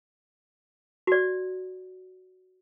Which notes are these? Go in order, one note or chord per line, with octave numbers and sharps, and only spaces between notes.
F#4 D5